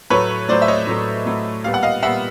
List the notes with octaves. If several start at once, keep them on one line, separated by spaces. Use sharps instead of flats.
A2 F#3 A3 B4 C#5
A2 F#3 A3 C5 D5
E5
C#5 D#5
A2 F#3 A3
A2 F#3 A3
A#2 G3 B3 F5
F#5
D#5 F5
A#2 G3 B3 E5 F#5